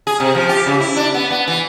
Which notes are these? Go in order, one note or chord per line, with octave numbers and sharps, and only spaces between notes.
G#4
C3
F3
G4
C#3
E4
D4
B3
B3
E3